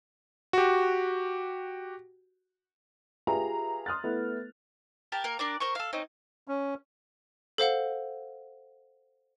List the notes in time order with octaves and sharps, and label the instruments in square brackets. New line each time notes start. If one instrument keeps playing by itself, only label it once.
[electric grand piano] F#4 G4
[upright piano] F4 G4 G#4 B4 E5 A#5
C6 D#6 F6 F#6 A6
A3 B3 E4
[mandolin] G4 A#4 A5
A#3 A#4
D4 A#4 D5
A#4 C5 C#6
A4 F5
C4 C#4 D#4
[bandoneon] C#4
[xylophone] A4 C5 F5 F#5